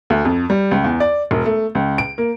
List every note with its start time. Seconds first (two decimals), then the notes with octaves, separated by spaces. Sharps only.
0.10 D2
0.25 F2
0.50 G3
0.71 C#2
0.84 E2
1.00 D5
1.31 E1
1.46 A3
1.75 C#2
1.98 D7
2.18 A#3